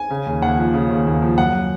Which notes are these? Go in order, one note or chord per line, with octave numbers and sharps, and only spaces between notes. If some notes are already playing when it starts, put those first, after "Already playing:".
Already playing: G#5
C#3
D#2
D#2 F#5
F3
C#3
D#2
D#2
F3
F#2 F#5